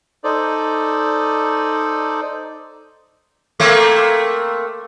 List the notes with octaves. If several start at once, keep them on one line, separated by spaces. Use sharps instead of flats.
D#4 A4 C5 D5
A3 A#3 C4